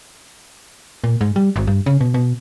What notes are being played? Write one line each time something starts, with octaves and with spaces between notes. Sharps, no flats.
A#2
G#2
G3
G#1
G2
C#3
B2
B2